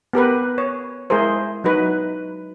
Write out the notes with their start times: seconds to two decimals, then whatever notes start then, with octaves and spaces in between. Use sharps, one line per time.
0.13 B3 G4 A#4 B4
0.58 C#5
1.10 G#3 E4 G#4 A#4 C5
1.64 F#3 D#4 F#4 B4